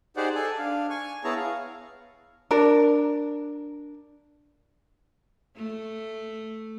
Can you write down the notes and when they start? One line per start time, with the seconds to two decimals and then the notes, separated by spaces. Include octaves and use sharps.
0.17 D#4 G4 G#4 C5 D5 F#5
0.35 A4 D5 G#5 A5
0.58 D4 F5
0.90 G#5 C#6
1.24 B3 E4 G#4 C#5 A5 A#5
1.37 F5
2.51 D4 A#4
5.56 A3